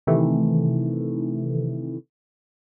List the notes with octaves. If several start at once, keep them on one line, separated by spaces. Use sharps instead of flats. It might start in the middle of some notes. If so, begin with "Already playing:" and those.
C3 D#3 E3 A3